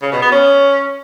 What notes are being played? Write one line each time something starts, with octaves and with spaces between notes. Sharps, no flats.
C#3
B2
B3
C#4